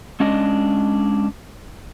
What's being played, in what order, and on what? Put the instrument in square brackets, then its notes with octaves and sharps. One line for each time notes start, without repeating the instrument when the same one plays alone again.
[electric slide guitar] G#3 C#4 D4 D#5